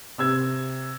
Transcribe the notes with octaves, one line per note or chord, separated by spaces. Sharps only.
C3 E6 G#6